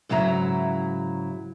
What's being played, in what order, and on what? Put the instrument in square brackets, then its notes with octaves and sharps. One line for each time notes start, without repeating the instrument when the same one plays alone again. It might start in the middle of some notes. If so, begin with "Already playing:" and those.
[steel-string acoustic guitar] G#2 C#3 F#3 E4 A#5